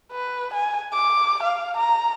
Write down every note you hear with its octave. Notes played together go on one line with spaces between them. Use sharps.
B4
G#5
D6
F5
A#5